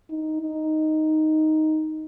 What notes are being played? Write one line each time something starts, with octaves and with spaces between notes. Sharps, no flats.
D#4
D#4